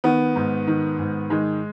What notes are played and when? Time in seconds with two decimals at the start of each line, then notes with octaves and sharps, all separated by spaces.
0.04 D#3 B3
0.36 G#2
0.67 D#3
0.99 G#2
1.30 D#3 G#3